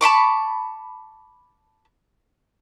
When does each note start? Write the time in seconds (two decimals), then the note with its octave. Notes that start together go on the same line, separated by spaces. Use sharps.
0.01 A5 B5 C#6 D6